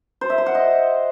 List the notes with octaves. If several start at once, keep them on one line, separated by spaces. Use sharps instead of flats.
C5
E5
C6
F#5
D#5